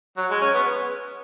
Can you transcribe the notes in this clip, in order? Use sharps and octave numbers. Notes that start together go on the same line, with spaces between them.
F#3
G#3
C#4
B3